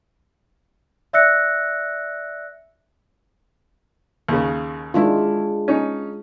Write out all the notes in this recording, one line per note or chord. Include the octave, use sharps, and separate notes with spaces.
D5 E5 E6 F#6 A#6 C#7
D#2 C#3
D#3 G#3 D4 E4 F4
C#4 D#4